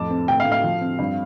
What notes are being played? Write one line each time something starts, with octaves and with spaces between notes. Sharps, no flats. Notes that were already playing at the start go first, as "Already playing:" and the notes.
Already playing: F2 A2 A5 D6
C4
A2 G5
F5
A2
F5
F3
C4
G2